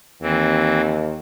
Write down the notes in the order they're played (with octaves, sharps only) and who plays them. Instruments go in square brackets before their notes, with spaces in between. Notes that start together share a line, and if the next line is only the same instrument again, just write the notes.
[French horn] D#2 [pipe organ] E3 C4